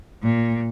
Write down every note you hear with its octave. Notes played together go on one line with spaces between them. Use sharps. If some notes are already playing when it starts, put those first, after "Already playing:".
A#2